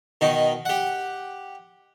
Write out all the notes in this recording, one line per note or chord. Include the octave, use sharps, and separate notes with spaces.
B2 D#3 D#4
G4 F#5